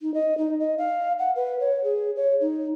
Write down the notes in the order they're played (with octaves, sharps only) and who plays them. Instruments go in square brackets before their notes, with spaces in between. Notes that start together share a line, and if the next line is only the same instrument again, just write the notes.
[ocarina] D#4
D#5
D#4
D#5
F5
F#5
B4
C#5
G#4
C#5
D#4